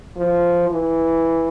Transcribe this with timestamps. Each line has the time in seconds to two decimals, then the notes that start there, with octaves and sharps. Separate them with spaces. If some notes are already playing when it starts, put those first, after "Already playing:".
0.17 F3
0.69 E3